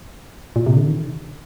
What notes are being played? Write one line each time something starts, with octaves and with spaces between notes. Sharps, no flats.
A#2
C3
D3
D#3